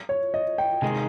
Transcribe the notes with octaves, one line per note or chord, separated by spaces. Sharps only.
C#5
D#5
G5
C3 D#3 G#3 D#4 G#4 G#5